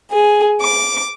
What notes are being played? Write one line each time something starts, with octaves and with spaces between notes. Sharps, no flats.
G#4
D6